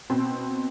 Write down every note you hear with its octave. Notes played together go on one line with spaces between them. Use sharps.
B2 C4